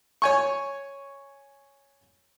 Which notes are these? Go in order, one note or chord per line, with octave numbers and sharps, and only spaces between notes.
C#5 G#5 C#6